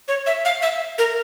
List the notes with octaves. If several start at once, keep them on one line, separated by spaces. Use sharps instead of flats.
C#5
E5
F5
E5
A#4